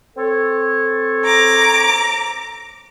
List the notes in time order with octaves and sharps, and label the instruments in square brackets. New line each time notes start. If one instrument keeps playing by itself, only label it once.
[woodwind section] C4 A4 C#5
[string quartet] A#5 D6